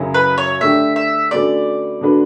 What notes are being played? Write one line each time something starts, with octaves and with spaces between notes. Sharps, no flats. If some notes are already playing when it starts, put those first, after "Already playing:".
Already playing: F#2 C#3 F#3 C#4 E4
B4
C#5
D3 A3 D4 G4 E5
E5
D3 A3 C#4 F#4 B4 D5
D3 A3 D4 F#4 B4